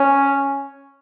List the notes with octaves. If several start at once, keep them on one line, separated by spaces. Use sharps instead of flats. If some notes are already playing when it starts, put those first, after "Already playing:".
Already playing: C#4